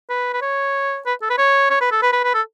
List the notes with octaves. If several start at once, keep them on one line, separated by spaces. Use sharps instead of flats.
B4
B4
C#5
B4
A4
B4
C#5
C#5
B4
A4
B4
B4
B4
A4